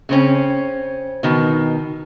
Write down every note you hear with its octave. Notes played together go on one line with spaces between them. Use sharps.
C#3 C4 C#4
B2 D#3